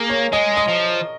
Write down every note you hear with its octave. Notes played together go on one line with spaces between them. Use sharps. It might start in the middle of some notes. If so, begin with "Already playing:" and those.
Already playing: A#3 G#4 A#4
C#5
G#3 D#5
D#5
F3